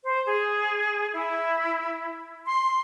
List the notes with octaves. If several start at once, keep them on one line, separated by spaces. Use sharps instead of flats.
C5
G#4
E4
C6